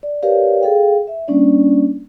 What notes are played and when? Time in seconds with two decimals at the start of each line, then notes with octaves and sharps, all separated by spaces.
0.03 D5
0.23 G4 A#4 B4 C#5 D5 F5
0.61 G#4 A4 F5 G5
1.07 E5
1.28 G3 A#3 C#4 D4 D5